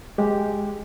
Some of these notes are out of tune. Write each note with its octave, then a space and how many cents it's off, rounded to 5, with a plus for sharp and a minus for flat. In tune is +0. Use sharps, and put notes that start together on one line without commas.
G#3 +0 G4 +0